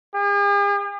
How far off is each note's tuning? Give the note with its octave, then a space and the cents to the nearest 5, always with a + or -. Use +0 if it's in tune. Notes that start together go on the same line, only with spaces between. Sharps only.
G#4 -45